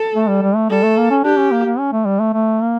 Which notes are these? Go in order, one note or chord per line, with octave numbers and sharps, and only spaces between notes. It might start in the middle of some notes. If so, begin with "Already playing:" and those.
Already playing: A4
A3
G3
G3
A3
G3 A4
A3
A#3
C#4
D4 G4
C#4
A#3
A#3
C#4
A3
G3
A3
A3
A#3